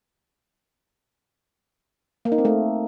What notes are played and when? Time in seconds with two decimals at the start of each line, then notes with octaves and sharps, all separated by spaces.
2.25 A#3
2.32 D#4
2.38 C4
2.45 A3